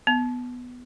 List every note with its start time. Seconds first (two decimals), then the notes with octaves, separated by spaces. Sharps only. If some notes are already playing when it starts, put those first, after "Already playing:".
0.07 B3